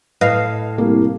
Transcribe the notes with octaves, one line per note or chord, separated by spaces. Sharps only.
A2 B4 D#5 F5
C2 A#3